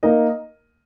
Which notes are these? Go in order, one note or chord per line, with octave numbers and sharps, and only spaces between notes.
A#3 D#4 A#4 D#5